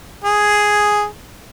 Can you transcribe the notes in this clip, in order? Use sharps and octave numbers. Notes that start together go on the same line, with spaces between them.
G#4